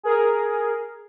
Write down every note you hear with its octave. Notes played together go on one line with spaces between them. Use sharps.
G#4 A#4